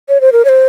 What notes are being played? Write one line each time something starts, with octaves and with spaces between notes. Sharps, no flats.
C#5
C5
A#4
C#5
C5